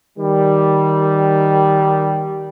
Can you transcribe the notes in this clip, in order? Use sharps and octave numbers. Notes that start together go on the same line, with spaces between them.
D#3 G3